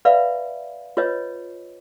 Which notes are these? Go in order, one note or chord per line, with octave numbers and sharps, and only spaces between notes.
B4 D5 E5 F5 B5
F4 B4 C#5 D#5